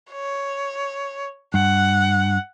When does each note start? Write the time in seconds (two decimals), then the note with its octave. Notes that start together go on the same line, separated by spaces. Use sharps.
0.12 C#5
1.54 G2 F#5